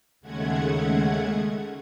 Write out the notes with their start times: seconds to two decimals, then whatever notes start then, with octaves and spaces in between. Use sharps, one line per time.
0.21 D#2 C#3 G#3 A3 F#5 G#6